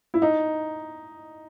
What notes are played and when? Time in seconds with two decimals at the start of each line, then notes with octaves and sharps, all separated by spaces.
0.14 E4
0.22 D#4